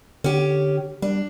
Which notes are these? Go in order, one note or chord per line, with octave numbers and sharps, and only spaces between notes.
D3 C#4 G4
G3 D4